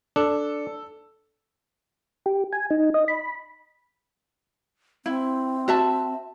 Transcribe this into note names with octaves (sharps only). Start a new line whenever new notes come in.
D4 A4
G4
G#5
D#4
D#5
B5
C4 E4
F#4 E5 A5